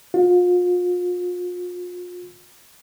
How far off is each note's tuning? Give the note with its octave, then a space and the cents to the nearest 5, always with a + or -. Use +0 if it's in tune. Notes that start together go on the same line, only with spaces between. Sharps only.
F4 +35